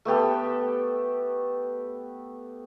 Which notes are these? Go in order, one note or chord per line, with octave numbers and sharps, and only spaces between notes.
A3 B3 G4 A4